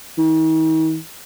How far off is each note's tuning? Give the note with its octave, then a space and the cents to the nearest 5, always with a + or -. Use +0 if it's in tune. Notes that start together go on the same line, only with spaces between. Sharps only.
D#3 +45